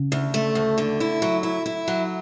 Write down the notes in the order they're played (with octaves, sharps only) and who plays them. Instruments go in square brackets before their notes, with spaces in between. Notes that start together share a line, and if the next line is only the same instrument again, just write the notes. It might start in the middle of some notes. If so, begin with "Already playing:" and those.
Already playing: [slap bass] C#3
[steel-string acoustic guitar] D2
A3
D2
D3
E4
F#3
E4
E4
F#3